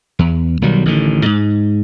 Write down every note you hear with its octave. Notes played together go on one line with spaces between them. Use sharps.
E2
B1 D#3 F#3 G3
A1 D3 D#3
G#2